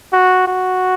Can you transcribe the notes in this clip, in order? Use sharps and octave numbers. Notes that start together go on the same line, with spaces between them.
F#4
F#4